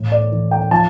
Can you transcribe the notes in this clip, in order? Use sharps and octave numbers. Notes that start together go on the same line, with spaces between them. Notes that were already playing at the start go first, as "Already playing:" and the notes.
Already playing: A2 E3
D5
E3
G5
F3 A5